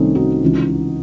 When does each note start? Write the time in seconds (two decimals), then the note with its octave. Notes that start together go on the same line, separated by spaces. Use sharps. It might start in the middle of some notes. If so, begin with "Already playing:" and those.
Already playing: C2 C3 D#3 A3 C4 C#4 D#4
0.15 D#4 F#4
0.42 C#2 C#3 E3